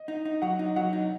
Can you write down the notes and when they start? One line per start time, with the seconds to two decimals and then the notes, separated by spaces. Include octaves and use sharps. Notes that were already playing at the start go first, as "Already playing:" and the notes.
Already playing: D#5
0.08 D#4
0.25 D#4
0.42 F#3 F#5
0.59 D#4
0.76 F#3 F#5
0.93 D#4